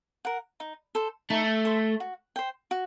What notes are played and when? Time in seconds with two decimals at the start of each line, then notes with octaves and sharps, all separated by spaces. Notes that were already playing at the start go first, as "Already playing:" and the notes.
0.25 A#4 F#5
0.60 D#4
0.95 A4 C5
1.30 A3 D#4
1.65 A4 C5
2.00 F#4
2.36 C5 G5
2.71 F#4